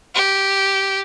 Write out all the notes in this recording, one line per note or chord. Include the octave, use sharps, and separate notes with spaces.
G4